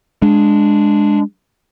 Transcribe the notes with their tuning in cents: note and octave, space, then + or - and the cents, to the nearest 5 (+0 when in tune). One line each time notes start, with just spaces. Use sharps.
G#3 +0 D4 +0